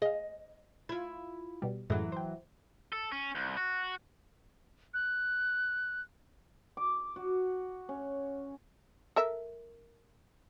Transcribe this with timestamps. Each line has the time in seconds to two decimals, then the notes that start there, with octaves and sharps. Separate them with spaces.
0.02 G#4 D#5 F5
0.89 E4 F4 G#6
1.62 B2 G3
1.90 F#2 A2 E3 F#3 G#3
2.12 C5 G5
2.92 A4
3.12 C#4
3.35 C2
3.57 F#4
4.94 F#6
6.77 D6
7.16 F#4
7.89 C#4
9.16 A4 A#4 E5